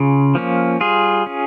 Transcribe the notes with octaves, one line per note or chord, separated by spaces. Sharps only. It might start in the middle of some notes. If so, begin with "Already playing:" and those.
Already playing: C#3 F4 G#4
F3 A#3 C#4
G3 F4 G#4
C#4